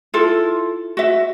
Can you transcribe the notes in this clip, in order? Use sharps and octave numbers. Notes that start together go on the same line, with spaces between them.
E4 F4 A4
F#4 E5